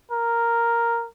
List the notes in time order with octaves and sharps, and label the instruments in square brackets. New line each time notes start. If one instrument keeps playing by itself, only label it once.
[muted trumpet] A#4